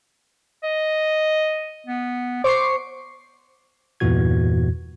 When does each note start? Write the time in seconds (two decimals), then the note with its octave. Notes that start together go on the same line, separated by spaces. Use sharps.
0.63 D#5
1.87 B3
2.44 C5 C#6 D6 C7
4.00 E2 G2 A#2 E3 F#4 G#6